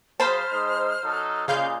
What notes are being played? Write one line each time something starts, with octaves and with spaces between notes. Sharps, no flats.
C#3 F#3 C5 A5 B5 F6
G#3 D#4
F#3 D#4 A4
A#2 C#3 G#3 F5 G6